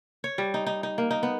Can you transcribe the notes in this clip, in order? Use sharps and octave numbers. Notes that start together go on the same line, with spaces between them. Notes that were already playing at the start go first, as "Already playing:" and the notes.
C#5
G3
D#4
D#4
D#4
A#3
D#4
B3